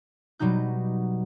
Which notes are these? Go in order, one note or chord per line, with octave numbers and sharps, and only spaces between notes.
B2 F#3 G3 D#4 G6